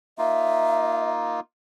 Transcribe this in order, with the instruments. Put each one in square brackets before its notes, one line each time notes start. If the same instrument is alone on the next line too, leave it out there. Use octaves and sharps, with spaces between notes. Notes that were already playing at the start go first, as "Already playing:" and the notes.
[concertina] A#3 D#4 F4 [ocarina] E5